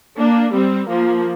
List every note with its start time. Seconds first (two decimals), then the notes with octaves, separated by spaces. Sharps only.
0.18 A#3 D4
0.54 G3 C4
0.90 F3 A#3